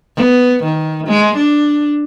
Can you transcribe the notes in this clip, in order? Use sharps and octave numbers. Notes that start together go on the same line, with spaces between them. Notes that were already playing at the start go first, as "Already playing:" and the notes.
B3
D#3
G#3
D4